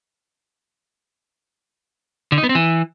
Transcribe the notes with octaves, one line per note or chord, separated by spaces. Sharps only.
D3
D#4
B3
C4
E3